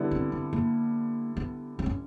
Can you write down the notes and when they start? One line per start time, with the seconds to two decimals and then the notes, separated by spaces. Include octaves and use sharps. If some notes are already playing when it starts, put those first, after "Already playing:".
Already playing: D3 G3 B3 E4
0.11 C4
0.32 C4
0.53 A#3
1.37 B3
1.79 C4
1.86 C#4